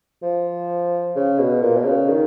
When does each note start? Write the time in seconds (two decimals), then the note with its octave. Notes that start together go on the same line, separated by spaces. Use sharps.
0.22 F3
1.16 C#3
1.39 B2
1.62 A#2
1.77 B2
1.84 C#3
2.08 D#3